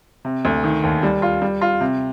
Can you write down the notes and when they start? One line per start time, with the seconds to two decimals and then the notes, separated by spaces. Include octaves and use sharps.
0.25 C3
0.45 D2
0.64 D#3
0.83 D#2
1.03 G3
1.22 F4
1.42 G3
1.61 F4
1.81 C3